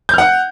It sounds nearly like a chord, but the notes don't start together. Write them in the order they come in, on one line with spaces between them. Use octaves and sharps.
G6 F6 F#5